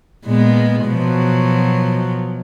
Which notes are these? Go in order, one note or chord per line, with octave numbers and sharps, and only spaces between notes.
A#2 G#3 B3
B2 F3 F#3